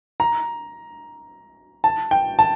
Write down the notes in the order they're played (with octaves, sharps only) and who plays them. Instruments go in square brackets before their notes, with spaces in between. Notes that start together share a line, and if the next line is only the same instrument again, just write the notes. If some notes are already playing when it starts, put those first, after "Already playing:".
[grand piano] A#5
A5
G5
A5